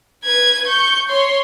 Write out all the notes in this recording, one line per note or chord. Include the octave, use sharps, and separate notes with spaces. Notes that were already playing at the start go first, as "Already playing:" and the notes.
B4 G#6
C#6 G6
C#5 C6